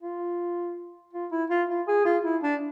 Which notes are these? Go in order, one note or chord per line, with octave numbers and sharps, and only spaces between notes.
F4
F4
E4
F4
F4
G#4
F4
E4
D4